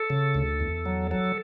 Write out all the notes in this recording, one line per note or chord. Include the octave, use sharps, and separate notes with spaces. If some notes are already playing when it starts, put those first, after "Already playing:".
Already playing: A4
C#3
D2
E2
F#3
F#3 A4